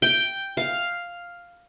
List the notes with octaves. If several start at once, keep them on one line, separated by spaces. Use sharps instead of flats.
G5
F5